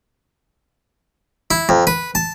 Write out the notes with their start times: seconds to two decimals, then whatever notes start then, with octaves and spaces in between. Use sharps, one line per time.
1.51 E4
1.69 F2
1.87 B4
2.15 A5